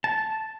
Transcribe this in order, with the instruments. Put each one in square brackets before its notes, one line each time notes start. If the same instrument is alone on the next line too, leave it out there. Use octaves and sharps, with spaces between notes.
[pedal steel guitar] A5